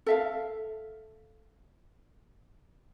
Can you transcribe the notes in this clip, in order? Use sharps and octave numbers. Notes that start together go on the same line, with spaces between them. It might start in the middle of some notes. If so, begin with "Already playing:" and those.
A4 E5 F5